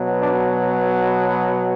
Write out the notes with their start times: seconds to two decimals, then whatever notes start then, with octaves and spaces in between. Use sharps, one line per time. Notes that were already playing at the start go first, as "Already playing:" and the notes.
Already playing: B2 F#3 B3
0.19 D4